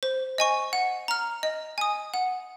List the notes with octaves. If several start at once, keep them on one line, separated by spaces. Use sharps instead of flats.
C5
D#5 G#5 C#6
F#5
A#5 F6
D#5
G#5 D#6
F#5